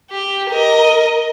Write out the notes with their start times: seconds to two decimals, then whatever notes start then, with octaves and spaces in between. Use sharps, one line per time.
0.11 G4
0.50 A#4 D#5